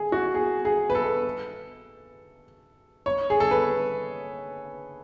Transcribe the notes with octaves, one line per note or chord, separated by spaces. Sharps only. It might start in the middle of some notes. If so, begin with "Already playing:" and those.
Already playing: G#4
F#4
G#4
G#4
B4
A4
C#5
G#4
A4
B4